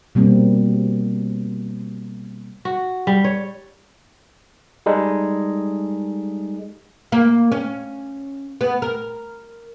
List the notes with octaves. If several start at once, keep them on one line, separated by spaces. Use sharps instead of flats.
B2 G3 A#3 C4
F#4
G3
C#5
G3 G#3 D#4 A4
A#3
C#4
B3
A#4